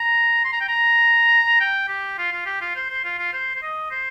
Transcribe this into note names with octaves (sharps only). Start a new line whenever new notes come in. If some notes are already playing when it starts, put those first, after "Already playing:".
Already playing: A#5
C6
A#5
G5
A#5
G5
G4
F4
F4
G4
F4
C5
C5
F4
F4
C5
C5
D#5
C5